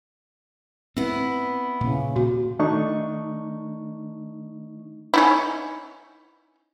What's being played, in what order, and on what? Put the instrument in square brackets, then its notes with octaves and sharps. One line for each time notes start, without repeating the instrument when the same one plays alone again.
[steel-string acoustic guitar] B3 E4 [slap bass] C4
[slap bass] A#2 [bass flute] C#3
[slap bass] A#2 [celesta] F#4
[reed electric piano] D#3 A3 D4 D#4 C#6
[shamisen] C#4 D#4 E4